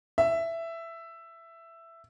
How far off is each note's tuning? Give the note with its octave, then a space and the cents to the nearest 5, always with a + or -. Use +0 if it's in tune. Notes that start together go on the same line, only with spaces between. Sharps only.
E5 +10